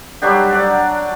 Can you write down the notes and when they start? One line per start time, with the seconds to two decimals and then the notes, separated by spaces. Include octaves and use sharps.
0.22 F#3 G3 D4 G4
0.53 D5 F#5